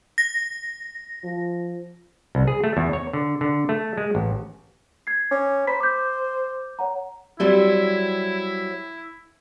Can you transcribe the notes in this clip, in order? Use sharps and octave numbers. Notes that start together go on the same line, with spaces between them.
A#6
F3
C2
G#4
A3
E2
C#5
D3
D3
A3
G#3
A1
G#6 C7
C#4 D6
C5 A#5 B5 B6
D6 G6
C#5 F#5 A#5
F#3 G3 C4 E4